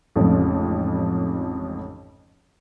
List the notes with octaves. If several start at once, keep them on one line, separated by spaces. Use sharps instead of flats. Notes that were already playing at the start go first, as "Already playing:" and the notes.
A1 F2 G#2 C#3 F3